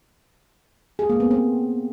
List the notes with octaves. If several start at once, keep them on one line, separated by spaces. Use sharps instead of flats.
G#4
A#3
B3
C4